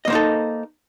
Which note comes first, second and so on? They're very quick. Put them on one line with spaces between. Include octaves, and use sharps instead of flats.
D#5 A#3 C5 D#4 A4